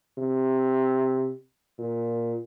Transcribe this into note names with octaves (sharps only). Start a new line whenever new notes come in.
C3
A#2